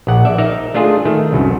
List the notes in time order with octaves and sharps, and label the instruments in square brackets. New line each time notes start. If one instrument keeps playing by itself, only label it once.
[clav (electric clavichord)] A#1 F#5
D5 E5
D#4 A#4 E5
A3 D4 F4 G#4
D#3 A3
C2 F#2